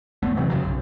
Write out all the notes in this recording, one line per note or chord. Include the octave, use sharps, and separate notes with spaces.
E2 A2 A3 B3
C3 E3 F#3 C4
F#2 C#3 F#3
B1